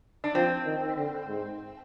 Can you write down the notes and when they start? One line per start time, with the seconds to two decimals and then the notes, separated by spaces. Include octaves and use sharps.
0.24 D4
0.34 F3 C4
0.65 D#3
0.97 D3
1.27 G#2